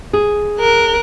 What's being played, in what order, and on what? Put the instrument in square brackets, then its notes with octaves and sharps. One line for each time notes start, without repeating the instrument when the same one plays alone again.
[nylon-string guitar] G#4
[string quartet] A#4 F#6